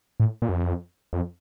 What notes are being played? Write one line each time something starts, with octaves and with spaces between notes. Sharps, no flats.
A2
A#2
F#2
F2
F2